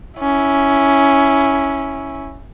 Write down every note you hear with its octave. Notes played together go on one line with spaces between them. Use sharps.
C#4 E4